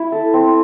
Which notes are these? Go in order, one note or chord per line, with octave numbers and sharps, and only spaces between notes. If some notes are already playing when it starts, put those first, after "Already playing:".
Already playing: E4
A4
C4